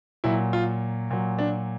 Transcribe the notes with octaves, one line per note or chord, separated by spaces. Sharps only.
A#2 F#3 E4
F4
A#2 F#3
D4